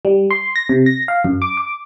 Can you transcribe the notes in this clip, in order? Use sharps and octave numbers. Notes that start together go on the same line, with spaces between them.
G3
C6
A#6
C3
A#6
F5
F#2
D6
D6